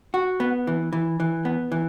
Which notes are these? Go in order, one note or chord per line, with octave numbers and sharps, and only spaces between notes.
F#4
B3
E3
E3
E3
B3
E3